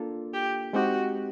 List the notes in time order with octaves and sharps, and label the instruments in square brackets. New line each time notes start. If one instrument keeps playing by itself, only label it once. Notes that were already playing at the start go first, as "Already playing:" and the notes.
Already playing: [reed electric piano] A#3 D4 F4 A4
[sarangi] G4
[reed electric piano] G#3 C4 D#4 G4 [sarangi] F#4